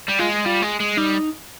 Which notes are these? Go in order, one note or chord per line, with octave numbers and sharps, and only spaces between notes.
G3
G#3 F4
G3 F4
G#3
G#3
G3 D#4